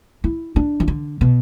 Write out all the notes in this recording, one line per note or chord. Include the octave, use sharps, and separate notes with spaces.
E4
D4
E3
D3
B2